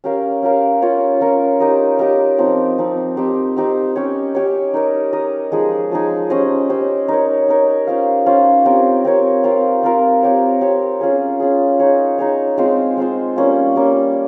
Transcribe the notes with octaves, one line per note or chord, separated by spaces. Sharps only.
C#4 G4 A#4 F5
C#4 G4 A#4 F5
C#4 F4 A#4 C#5
C#4 F4 A#4 C#5
D#4 G4 A#4 D#5
D#4 G4 A#4 D#5
F3 C4 D#4
F3 C4 D#4
C4 D#4 G4 C5
C4 D#4 G4 C5
C#4 G4 C#5
C#4 G4 C#5
D#4 A#4 D#5
D#4 A#4 D#5
F3 G#3 D#4 G#4
F3 G#3 D#4 G#4
C#4 G4 C5 D#5
C#4 G4 C5 D#5
D#4 A#4 C#5
D#4 A#4 C#5
C#4 F4 C5 F5
C#4 F4 C5 F5
C4 G4 A#4 C#5
C4 G4 A#4 C#5
C4 F4 A#4 F5
C4 F4 A#4 F5
C4 G4 C#5
C4 G4 C#5
C#4 F4 G#4
C#4 F4 G#4
D#4 G#4 C#5
D#4 G#4 C#5
G#3 C4 F4 C5
G#3 C4 F4 C5
G3 A#3 C#4 F4
G3 A#3 C#4 F4